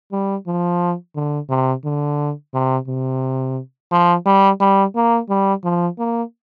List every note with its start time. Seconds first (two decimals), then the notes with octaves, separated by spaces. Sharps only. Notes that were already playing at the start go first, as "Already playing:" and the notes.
0.12 G3
0.47 F3
1.15 D3
1.50 C3
1.85 D3
2.54 C3
2.88 C3
3.92 F3
4.26 G3
4.60 G3
4.96 A#3
5.29 G3
5.64 F3
5.99 A#3